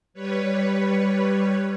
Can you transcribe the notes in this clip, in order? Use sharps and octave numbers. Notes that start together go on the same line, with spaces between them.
G3 B4 C#5